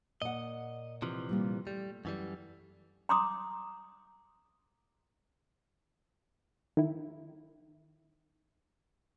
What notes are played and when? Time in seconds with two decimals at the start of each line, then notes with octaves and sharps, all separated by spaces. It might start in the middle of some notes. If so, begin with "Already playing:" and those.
0.22 A#2 D#5 F#5
1.02 C3 E3 F3
1.29 A#2 G3 A#3
1.67 G3 A3
2.05 F#2 E3 G3
3.09 A#5 C6 D6 D#6
6.77 D#3 E4